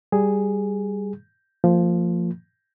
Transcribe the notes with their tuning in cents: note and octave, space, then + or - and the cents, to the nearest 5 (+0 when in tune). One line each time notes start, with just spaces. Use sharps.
G3 +0 G#4 +0
F3 -5 A#3 -40